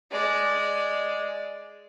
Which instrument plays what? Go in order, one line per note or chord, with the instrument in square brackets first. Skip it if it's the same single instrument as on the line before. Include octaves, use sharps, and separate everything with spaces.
[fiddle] G#3 D5